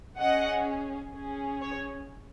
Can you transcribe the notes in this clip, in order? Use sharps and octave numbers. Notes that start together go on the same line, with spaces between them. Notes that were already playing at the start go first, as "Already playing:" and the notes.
C#4 G#4 D#5 F#5
C#4 G#4
C#5